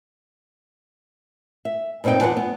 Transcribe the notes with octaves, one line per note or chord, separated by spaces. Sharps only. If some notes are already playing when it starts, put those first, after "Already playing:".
E5
G2 A#2 C4 D#4 G5
E2 D4 F4 B4 F#5
B3